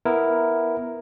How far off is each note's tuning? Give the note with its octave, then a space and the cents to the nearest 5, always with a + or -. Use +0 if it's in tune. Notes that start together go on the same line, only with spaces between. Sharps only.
B3 -5 E4 +0 A#4 +0